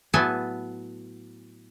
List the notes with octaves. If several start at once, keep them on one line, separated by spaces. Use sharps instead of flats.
A2 F#3 B3 A4 G#5 A5